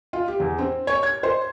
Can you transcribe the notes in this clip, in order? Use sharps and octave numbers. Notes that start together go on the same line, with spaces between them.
F4
G4
E2
C4
C#5
G#6
C5